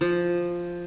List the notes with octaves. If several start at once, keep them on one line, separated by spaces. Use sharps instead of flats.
F3